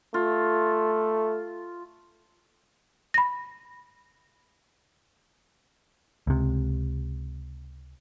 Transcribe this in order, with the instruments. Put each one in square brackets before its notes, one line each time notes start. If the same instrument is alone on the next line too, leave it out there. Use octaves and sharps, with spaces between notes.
[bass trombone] A3 [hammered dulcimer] F4
[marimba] B5 A#6
[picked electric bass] C#2 C3